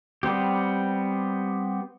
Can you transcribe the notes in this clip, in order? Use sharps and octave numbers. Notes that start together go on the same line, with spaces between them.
G3 B3 C4 G4